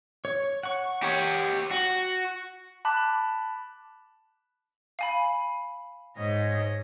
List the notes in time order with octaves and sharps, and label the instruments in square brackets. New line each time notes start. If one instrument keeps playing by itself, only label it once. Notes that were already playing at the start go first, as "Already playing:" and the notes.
[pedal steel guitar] C#5
F#5 C#6
[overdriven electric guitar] G4 C#5
F#4
[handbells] A5 B5 D6 F#6
[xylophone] F5 G#5 B5
[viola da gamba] G#2 C#5 D#5